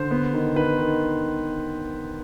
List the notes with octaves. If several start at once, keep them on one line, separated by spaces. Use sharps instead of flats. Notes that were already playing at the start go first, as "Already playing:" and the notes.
Already playing: D3 C5
B3
D#3
D#3 B4
D#3